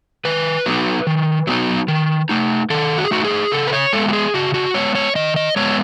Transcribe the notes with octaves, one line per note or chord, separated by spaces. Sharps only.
D#3 B4
F#3 B3 D#4
D#3
F#3 B3 D#4
D#3
A3 D#4
D#3 A4
F#4
G#4
A3 D#4 F#4
G#4
C#3 A4
B4
C#5
G#3 B3 A4
F#4
G#4
C#3 F#4
F#4
G#3 B3 C#5
C#5
D#3 D#5
D#5
G#3 B3 C#5